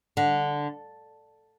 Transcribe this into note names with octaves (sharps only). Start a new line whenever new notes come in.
D3